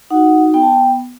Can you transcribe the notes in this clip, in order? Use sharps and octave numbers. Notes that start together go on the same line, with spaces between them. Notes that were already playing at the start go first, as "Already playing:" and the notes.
D#4 F#4 F#5
B3 G5
A5
G5